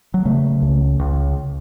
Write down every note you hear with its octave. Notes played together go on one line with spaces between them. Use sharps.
F#3
C#3 A3
C#2
C#2